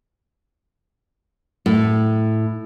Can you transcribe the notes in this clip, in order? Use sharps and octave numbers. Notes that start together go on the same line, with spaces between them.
A2